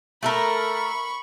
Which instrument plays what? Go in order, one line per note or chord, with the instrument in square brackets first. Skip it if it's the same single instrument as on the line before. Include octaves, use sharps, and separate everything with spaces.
[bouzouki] A3 A4 A#4 [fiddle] B5 C#6